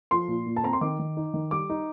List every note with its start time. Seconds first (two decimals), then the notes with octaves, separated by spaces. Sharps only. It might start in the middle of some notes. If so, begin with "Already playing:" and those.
0.11 F3 C6
0.28 A#2
0.46 A#2
0.56 A5
0.64 C4 A#5
0.73 C6
0.81 D#3 D6
0.99 D#3
1.17 D#4
1.34 D#3
1.51 G3 D6
1.70 D#4